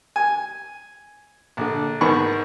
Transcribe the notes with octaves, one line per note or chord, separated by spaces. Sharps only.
G#5
A#1 D3
G#1 D#3 B3 B5 C#6